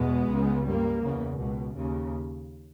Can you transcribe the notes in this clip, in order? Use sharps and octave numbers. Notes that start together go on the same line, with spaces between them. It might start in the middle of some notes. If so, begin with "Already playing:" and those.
Already playing: E2 B2 G#3 B3
C#2 C#3
G2 G3 A#3
E2 C#3
C#2 B2
D#2 C#3